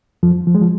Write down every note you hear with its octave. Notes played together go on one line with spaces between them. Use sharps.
F2 F3
F3
G#3
F3